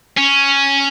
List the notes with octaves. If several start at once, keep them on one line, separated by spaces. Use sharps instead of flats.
C#4